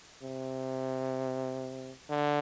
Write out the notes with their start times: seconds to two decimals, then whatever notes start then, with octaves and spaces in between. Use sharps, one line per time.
0.23 C3
2.10 D3